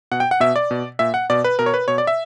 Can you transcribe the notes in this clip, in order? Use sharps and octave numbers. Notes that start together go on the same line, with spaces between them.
B2 F#5
G5
F#5
B2 E5
D5
B2
A#2 E5
F#5
B2 D5
B4
B2 A#4
C#5
B4
B2 C#5
D5
E5